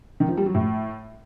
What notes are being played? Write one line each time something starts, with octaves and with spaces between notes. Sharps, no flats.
D#3
F3
G3
F#3
A2